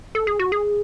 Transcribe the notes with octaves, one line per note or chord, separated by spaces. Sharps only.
A4
G#4
F#4
G#4